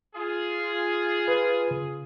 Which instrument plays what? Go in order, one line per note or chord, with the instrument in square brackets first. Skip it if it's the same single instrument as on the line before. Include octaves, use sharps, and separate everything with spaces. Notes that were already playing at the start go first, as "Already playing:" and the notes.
[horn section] F4 G#4
[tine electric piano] B4
C#3